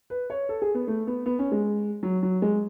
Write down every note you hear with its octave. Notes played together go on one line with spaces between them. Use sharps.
B4
C#5
A4
G#4
B3
A3
B3
B3
C#4
G#3
F#3
F#3
G#3